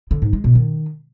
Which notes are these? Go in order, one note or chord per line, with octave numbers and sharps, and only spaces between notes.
D3
G#2
G#3
B2
D#3